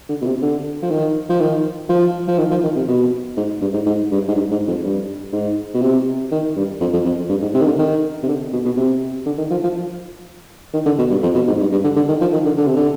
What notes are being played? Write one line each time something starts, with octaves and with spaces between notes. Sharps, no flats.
D3
B2
C3
D3
F3
D#3
F3
D#3
F3
F3
D#3
F3
D#3
C3
B2
G#2
G2
G#2
G#2
G2
G#2
G2
G#2
F2
G2
G#2
B2
C3
D#3
G2
F2
F2
F2
G2
G#2
C3
D#3
D3
D#3
C3
D3
B2
B2
C3
D3
D#3
F3
F3
D#3
D3
B2
G2
F2
B2
G#2
G2
G2
D3
D3
D#3
F3
D#3
D3
D3
C3
D3